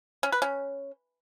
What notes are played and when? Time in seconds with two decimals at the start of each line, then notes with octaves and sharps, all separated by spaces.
0.23 C#4
0.32 B4
0.42 C#4